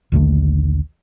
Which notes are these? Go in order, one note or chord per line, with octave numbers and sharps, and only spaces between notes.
A#1 D#2 D3 A3